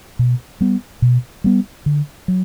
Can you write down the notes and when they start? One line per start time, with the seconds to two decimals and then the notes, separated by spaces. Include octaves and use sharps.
0.19 B2
0.61 G3 B3
1.02 B2
1.44 G3 B3
1.86 D3
2.28 F#3